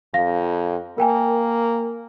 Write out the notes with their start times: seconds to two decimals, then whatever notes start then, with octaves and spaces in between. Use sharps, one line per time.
0.14 F2 F5 A#6
0.98 A#3 A#4 G5 G#5